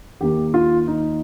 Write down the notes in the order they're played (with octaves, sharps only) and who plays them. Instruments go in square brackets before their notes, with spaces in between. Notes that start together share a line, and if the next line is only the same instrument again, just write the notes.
[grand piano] D#2 D#3 A#3 G4
F4
D#4